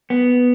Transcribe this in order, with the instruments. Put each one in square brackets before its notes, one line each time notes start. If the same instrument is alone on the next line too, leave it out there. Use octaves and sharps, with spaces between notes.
[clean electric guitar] B3